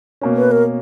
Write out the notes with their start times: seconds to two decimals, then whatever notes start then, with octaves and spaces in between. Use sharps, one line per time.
0.21 B2 A#3 C#4
0.37 B4
0.51 A#4